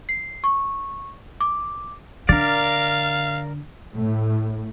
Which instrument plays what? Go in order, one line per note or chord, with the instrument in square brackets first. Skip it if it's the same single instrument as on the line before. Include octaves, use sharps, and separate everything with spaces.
[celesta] C7
C#6
D6
[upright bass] D3 [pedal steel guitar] A#4 D5 [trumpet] F5
[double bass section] A2